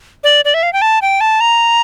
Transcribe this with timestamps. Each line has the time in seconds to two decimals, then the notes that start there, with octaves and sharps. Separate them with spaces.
0.24 D5
0.45 D5
0.54 E5
0.63 F5
0.73 G5
0.82 A5
1.02 G5
1.21 A5
1.41 A#5